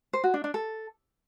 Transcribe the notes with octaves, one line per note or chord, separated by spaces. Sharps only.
C5
F#4
D4
D4
A4